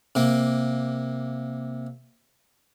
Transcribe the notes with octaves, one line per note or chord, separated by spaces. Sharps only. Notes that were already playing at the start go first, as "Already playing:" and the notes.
C3 A#3